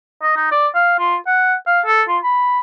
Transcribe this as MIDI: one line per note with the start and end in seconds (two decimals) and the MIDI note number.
0.23 0.34 75
0.37 0.49 63
0.52 0.67 74
0.75 0.97 77
0.99 1.16 65
1.27 1.54 78
1.67 1.81 77
1.86 2.03 69
2.08 2.18 65
2.23 2.61 83